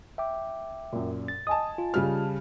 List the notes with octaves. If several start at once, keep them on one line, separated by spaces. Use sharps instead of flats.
E5 G5 D6
F#2 A#2
A6
D#5 G#5 A5 D#6
F4
C#3 G3 F6